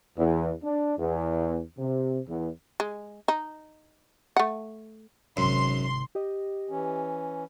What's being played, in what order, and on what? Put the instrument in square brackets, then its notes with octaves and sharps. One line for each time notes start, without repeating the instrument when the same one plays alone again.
[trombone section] E2
D4
E2
C3
E2
[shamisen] G#3
D#4
A3 F#5
[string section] G#1 C6 [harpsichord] F#2 [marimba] C3
[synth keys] G4 D#5
[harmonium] E3 C#4